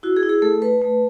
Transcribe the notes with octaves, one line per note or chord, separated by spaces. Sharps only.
E4 F#4
G#4
E4
G#4
A3 A4
A3 B4
A3